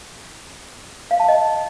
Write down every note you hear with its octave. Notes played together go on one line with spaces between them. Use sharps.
F5
A5
D#5